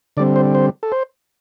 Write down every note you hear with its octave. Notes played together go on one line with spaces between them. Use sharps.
D3 G3 C4 D5
C5
C5
A4
C5